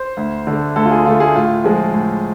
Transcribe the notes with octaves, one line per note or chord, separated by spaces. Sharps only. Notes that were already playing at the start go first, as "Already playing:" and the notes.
Already playing: C5
D2
D3 A3
D2 A4
F4
G#4
D3 A3 F4
G#4
A2 F4
F3 G#3
A2